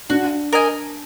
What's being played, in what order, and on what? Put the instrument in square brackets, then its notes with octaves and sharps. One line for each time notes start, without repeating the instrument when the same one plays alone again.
[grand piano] D4 [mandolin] F#4
[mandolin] A#4 D#5 G#5